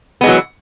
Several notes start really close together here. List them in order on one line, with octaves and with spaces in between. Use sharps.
B3 G#3 E3 F#3